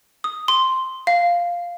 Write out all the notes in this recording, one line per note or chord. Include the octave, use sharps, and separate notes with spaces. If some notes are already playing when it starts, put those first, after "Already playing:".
D#6
C6
F5